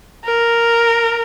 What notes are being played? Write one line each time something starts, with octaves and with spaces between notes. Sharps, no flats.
A#4